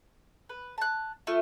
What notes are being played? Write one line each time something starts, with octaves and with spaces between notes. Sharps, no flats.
B4
A5 F#6
A3 F4 E5